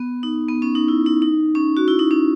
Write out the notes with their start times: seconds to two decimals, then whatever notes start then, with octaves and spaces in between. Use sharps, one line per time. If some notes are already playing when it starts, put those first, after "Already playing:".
Already playing: B3
0.23 D#4
0.49 B3
0.62 C#4
0.75 D#4
0.88 E4
1.06 D#4
1.22 D#4
1.55 C#4
1.77 F#4
1.88 E4
1.99 D#4
2.11 C#4